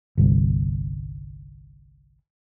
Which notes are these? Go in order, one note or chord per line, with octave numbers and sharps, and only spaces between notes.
G1 C2